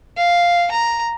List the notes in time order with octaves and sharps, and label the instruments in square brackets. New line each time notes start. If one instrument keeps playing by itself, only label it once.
[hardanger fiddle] F5
A#5